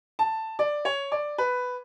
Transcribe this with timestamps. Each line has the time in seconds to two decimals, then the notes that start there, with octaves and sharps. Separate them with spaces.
0.19 A5
0.59 D5
0.85 C#5
1.12 D5
1.38 B4